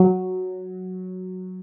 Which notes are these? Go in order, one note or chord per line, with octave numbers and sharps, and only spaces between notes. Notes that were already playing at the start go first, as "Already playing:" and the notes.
Already playing: F#3